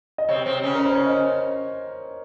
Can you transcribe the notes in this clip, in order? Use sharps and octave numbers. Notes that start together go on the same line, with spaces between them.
D#5
C3 C4 C#5
C3 C4
C#3 C#4
A#4
C5
C#5
D#5